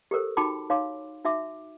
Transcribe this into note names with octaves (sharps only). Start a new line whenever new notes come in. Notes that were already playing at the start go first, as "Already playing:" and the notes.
G4 A4 A#4 C5
D#4 F#4 G5 A5 B5 D6
D#4 C#5 F5 C6 D6
D#4 F#4 E5 D6